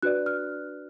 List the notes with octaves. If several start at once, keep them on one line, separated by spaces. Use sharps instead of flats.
D4 F#4 B4 D5 F#6
F6